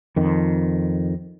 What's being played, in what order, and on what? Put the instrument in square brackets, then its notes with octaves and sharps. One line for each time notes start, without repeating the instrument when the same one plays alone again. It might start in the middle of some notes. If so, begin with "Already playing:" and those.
[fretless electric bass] F2 D#3